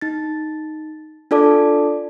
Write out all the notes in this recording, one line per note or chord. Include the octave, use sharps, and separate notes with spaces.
D#4 A6
D4 F4 A4 D5 A5 D6